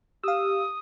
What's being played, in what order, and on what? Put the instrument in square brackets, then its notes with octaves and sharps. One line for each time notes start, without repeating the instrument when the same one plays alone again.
[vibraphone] G4 [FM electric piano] F5 E6 [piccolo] D#6